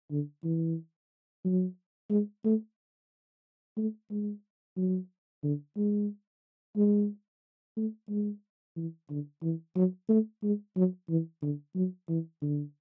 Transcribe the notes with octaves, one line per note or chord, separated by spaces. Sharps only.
D3
E3
F#3
G#3
A3
A3
G#3
F#3
D3
G#3
G#3
A3
G#3
E3
D3
E3
F#3
A3
G#3
F#3
E3
D3
F#3
E3
D3